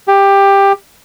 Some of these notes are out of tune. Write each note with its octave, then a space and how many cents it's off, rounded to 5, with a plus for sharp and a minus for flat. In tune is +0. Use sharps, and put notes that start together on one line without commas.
G4 +15